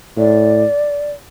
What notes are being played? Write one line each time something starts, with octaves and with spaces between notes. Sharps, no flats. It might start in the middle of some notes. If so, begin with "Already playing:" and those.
A2 D5